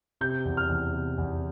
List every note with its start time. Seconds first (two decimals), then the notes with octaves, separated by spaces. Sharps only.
0.21 C3 G6
0.45 E2
0.57 F6
0.69 E2
0.93 C3
1.18 E2